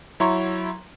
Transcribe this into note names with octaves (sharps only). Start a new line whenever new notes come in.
F#3 E4 C#5 A#5 C6 C#6